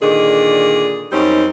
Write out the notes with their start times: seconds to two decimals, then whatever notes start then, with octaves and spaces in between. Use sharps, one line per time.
0.01 A#2 D3 D#3 G#3 D4 G#4
1.12 F#2 G3 C4 C#4 D#4